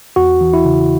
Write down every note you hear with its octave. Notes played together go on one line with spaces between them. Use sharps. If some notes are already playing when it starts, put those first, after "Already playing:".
E2 F#4
E3
E4
C#3